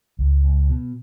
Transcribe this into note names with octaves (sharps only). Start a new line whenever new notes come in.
C#2
C#2
B2